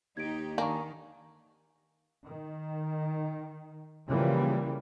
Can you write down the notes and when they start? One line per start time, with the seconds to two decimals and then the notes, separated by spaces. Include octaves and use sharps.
0.17 D#2 D#4 G4 G#6 D7
0.58 D#3 A#3 D4 G#5 A#5 C#6
2.25 D#3
4.08 C#3 E3 F3 G3 A#3